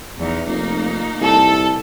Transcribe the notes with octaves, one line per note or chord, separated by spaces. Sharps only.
E2 D#4
F1 A#3 D#4
C2 A4